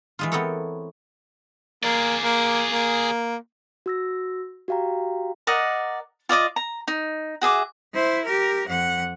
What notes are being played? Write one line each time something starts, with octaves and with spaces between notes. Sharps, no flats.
E3 G#3 F4
B3 C4 A4 A#4 C#5
A#3 G#4 D5
A#3
A#3
F#4 E6 A#6
F#4 G4 F5 G5 A#5
A#4 D5 D#5 F#5
F4 D5 D#5 D6
A#5
D#4
F#4 G#4 E5 D6
E4 C5
G4 A#4
F2 F#5